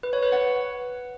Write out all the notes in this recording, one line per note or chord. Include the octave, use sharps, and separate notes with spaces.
B4
C#5
B4
F#5